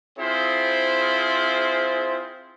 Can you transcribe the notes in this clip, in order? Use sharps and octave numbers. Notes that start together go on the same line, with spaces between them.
C4 E4 F4 G#4 C5